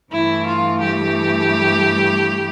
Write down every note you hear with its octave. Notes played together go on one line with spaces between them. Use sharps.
G2 E3 A3 E4
F4
G3 G4